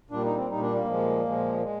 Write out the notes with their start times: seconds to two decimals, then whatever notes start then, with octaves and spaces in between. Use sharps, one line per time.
0.10 A#2 G3 D4
0.24 D#4
0.36 C4
0.49 A#2 G3 D#4
0.62 D4
0.74 A#3
0.86 A#2 F3 G#3
1.25 A#2 F3 G#3
1.62 G#3